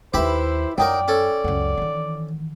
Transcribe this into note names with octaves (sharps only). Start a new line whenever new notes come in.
D#2 D#4 E4 G4 B4 C5 E5 B5
F#2 F#3 D#4 A#4 D5 G5
C#4 A4
C#2 F#2 F#5
D#3 E3